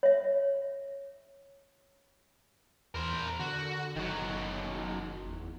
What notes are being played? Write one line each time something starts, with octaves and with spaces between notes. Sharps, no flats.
C#5 E5
E2 A#4 C5
D3 F#4
F#1 D#3 F#3
E2